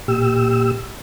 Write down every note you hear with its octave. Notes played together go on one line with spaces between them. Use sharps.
A#2 G4 E6